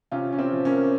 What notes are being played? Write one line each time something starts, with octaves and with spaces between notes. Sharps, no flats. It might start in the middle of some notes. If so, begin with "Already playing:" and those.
C3 C#4 F4
C#4
C4
F3
A#3 C#4